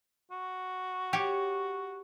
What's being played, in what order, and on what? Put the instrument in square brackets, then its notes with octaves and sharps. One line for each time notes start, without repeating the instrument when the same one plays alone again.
[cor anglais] F#4
[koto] G4 C#5